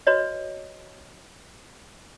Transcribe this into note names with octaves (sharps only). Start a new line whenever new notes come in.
F#4 B4 C#5 D#5